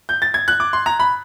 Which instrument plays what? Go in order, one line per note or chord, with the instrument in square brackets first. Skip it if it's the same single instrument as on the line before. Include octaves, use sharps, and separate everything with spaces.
[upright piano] G6
A6
G#6
F#6
D6
C6
A#5
B5